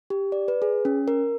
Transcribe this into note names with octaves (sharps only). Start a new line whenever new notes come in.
G4
D5
B4
G#4
C#4
A#4